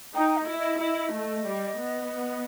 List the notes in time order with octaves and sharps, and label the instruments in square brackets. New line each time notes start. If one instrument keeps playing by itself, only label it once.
[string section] D#4 [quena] G5
[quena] D#5
[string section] E4
[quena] D#5
[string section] E4 [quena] D#5
[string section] A3
G3
B3